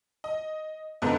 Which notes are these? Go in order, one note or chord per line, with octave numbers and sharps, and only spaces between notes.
D#5
G#2 D3 F3 B3 A#5